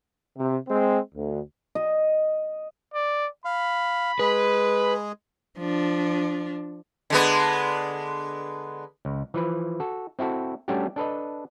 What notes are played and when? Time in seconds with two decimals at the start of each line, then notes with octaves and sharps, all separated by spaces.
0.38 C3
0.69 G#3 C4
1.15 D2
1.75 D#5
2.94 D5
3.45 F5 B5
4.19 G#3 G#4 B4
5.58 F3 D4
7.10 D3 G#3 B3
9.05 C#2
9.34 E3 F3 B4
9.80 F#4 A4
10.19 C4 E4 F#4 A4
10.68 G3 A3 C#4 D4 F#4 G4
10.96 D4 A4 B4 D#5